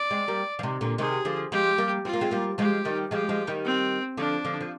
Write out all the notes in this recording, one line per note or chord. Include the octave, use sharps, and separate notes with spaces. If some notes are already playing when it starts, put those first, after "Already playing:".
Already playing: D5
G#3 C4
G3 A#3
F3
C3 D#3
A#2 D3
C3 D#3 G#4
D3 F3
F3 G#3 G4
G3 A#3
C4 F4
A#3
G#3 C4
G3 A#3
F3 G#3 G4
D#3 G3
F3 G#3 G4
F3 G#3
D#3 G3
C4
D3 F3 D4
D3 F3
F3